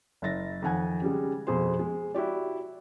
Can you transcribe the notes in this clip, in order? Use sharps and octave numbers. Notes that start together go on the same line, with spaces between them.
F#1 E5 A6 A#6
F2 D#3 F#5 G#5 G#6
C#3 G3 G#3
F2 B2 G#4 C5 C6
G#3
E4 F#4 G4 D5